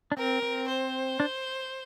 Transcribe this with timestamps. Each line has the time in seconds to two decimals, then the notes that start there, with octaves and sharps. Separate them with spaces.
0.12 D4
0.17 C4 A#4
0.42 C4
0.68 C5
1.20 D4